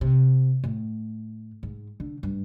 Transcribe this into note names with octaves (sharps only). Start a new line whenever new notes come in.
C3
A2
G#2
D3
G2